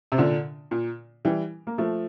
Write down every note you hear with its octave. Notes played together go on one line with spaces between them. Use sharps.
C3
A#2 D3
A#2
E3 G3
A#3
F3 A3